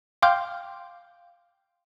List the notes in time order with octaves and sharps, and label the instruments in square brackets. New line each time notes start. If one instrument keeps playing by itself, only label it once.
[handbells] F5 G5 C6 D6 F6 G6